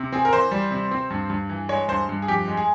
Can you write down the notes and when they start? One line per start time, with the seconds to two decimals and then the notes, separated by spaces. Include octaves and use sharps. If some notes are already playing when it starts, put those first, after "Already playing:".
Already playing: C3
0.12 C4 G#4
0.25 A#4
0.33 E3 C5
0.51 G3
0.71 C3
0.91 C4
1.10 G2
1.30 G2
1.49 E3
1.69 G#3 C#5
1.88 G2 C5
2.09 G2
2.22 G#4
2.28 F2 G4
2.48 G#3
2.57 G#4